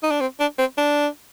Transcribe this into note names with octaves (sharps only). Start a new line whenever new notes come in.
D#4
D4
C4
D4
C4
D4